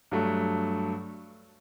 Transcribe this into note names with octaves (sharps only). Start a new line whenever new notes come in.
G2 F#3 A3